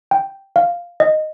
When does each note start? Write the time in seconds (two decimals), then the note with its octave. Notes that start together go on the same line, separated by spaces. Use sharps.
0.11 G5
0.56 F5
1.00 D#5